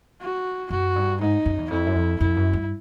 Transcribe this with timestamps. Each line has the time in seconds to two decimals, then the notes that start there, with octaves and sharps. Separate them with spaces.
0.21 F#4
0.70 F#2 F#4
0.96 G2
1.21 G#2 D#4
1.46 F#2
1.58 E2
1.70 F2 E4
1.86 F#2
1.95 F2
2.20 F2 E4
2.37 F#2
2.53 G2